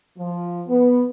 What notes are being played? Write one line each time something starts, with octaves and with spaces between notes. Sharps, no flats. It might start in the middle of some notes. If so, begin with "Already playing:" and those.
F3
B3